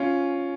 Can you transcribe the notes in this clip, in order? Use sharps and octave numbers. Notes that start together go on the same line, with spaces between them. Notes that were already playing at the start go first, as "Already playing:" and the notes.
Already playing: C#4 F4